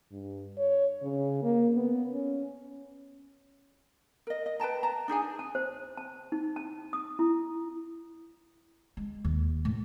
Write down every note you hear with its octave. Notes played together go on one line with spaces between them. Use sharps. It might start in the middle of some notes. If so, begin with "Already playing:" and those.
G2
C#5
C#3
A#3
B3
C#4
A#4 D#5
D#5
B4 G5 A5 A#5
A5 A#5
D4 D#4 G#4 G#5
A5
C5
A5
D#4
A5
D#6
E4
G#3
D#2
A2